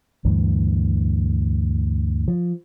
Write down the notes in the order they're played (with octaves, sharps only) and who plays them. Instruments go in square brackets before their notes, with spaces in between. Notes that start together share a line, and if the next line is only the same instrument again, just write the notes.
[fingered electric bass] D2 G2 E3
F3